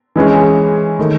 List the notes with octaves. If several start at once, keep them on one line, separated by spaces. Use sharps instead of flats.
E3 G#3 C#4 E4 G#4
D#3 A3